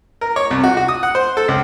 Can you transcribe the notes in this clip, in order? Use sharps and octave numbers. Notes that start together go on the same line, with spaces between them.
A#4
C#5
C2
F#4
F#4
D#6
F#5
C5
A4
C#2